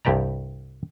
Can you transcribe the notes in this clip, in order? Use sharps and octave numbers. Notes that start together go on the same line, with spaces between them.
C2 G2 G4 D5 A#5